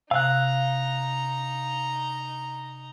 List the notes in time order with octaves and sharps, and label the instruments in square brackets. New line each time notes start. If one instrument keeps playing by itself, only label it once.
[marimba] C3 [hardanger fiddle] D#4 A#5 [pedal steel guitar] F5 F#6